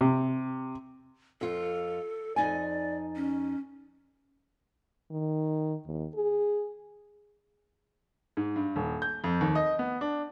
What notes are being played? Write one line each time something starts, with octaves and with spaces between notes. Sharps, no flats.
C3
F2 F4 A4
F2 D#4 D5 G#5
C#4
D#3
D#2
G#4
G#2
G2
D#1
G6
F2
D#2
D#5
B3
D4